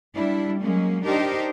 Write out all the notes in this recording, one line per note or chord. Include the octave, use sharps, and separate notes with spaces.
G3 D4 E4
F#3 G#3 A#3 C#4
D4 D#4 G4 A#4 C5